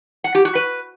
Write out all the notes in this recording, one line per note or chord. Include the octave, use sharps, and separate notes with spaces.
F#5
G4
F#4
B4